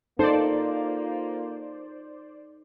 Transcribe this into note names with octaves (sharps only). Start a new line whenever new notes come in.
A#3 D#4 F4 A4 C5 D5